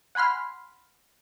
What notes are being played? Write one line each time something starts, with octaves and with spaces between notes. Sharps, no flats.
F#5 G#5 B5 C6 F6